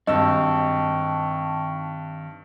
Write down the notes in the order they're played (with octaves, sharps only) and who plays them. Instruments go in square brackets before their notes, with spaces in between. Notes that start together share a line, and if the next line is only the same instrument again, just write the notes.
[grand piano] G2 E6 [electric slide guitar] D#3 C4 [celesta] D#5 [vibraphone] G5 A5 C#6